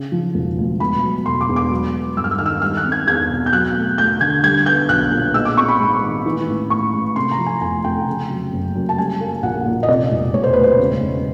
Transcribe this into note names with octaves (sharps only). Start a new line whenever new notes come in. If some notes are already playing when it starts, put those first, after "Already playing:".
Already playing: C#3
F3
E1
D2
B2 B5
F#3
E1 C6
D6
E2
D6
F#3
B3
G2 E6
F6
E6
D#3 F6
E6
G3 F6
F#6
C4
G#6
E2 G#6
B2
G6
F#3 F#6
A3
D2 G6
D3 G#6
G3 G#6
B3 G6
B1 F#6
A#2
G#3 E6
D6
C4 C#6
B5
G#2
D#3
E3
A1
A1 C#6
G#2
C3 C6
A#5
F3
G#5
F1 G#5
F2 G5
C#3
F#3
F#1
F#2
A5
G3 G#5
A#3
A#1 F#5
A#2
D#5
C3 D5
E1
E1 C#5
C5
D2 B4
C5
C#3
E1